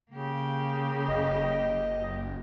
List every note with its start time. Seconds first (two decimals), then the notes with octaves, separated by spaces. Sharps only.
0.11 C#3 A#3 G4
1.08 F#1 D#5